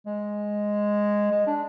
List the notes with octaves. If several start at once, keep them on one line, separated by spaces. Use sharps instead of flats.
G#3
G#3
D4